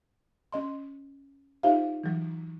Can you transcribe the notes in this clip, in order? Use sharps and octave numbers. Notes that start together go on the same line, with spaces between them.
C#4 D#5 C6
D#4 F4 G4 C5 E5 F5
E3 F#3